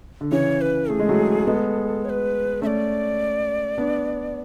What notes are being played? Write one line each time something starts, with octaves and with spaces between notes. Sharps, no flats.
D3
C#3 E3 C#5
B4
A3 G#4
G#3
F#3 A3
G#3 B3 A4
C#5
B4
A3 C#4 D5 E5
B3 D4